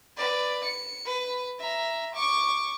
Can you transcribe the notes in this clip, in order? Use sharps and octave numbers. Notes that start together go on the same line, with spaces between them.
B4 D5
C#7
B4
E5 A#5
C#6 D6